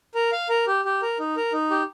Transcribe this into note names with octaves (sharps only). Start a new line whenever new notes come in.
A#4
F5
A#4
G4
G4
A#4
D#4
A#4
D#4
G4